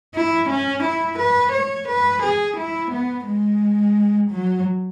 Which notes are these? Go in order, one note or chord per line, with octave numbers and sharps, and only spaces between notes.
E4
C#4
E4
B4
C#5
B4
G#4
E4
B3
G#3
F#3